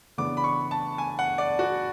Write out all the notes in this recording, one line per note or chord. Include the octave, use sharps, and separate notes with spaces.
C#3 E3 B3 D4 D6
B5
C#6
A5
G#5
F#5
D5
F#4